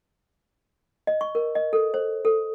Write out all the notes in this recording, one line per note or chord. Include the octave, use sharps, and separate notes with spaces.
D#5
C#6
A#4
D#5
A4
C5
A4